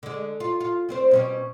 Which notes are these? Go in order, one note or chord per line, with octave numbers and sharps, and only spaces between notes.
D3 G#3
F4
F4
G3 C4 C5
B2 G3 C#4